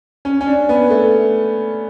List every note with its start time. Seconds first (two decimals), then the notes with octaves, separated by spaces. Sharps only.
0.25 C#4
0.41 C#4
0.47 D4
0.69 B3
0.90 A3